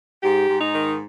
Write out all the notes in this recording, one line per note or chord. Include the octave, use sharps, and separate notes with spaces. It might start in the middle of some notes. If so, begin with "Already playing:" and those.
G#2 G4
G#2
D#4
D#3